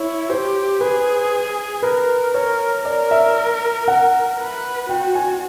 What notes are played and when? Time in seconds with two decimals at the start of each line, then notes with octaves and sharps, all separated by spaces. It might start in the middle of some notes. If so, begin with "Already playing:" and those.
Already playing: E4 C#5
0.29 G4 C5
0.81 G#4 B4
1.83 A#4 B4
2.34 A#4 C#5
2.85 A#4 D5
3.11 E5
3.88 F#5
4.39 B4
4.89 F#4 G5
5.15 G#5